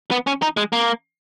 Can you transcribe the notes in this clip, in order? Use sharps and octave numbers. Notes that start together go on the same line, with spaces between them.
B3
C#4
D#4
G#3
A#3